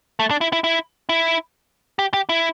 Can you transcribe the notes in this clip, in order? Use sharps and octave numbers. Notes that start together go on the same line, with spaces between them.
A3
D4
E4
E4
E4
E4
G4
G4
E4